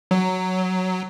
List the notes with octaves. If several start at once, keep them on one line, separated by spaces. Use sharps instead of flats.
F#3